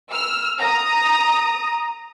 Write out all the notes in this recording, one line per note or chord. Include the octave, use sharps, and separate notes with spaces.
E6 F6
A#5 D#6